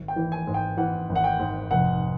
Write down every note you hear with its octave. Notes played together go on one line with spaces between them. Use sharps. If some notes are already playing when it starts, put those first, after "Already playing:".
Already playing: G#1
G5
E3
G#5
G#2
G5
E3 F#5
G#1
F#5
G5
G#2
F1 F#5